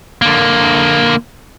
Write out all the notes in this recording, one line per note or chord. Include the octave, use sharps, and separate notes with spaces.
D3 A#3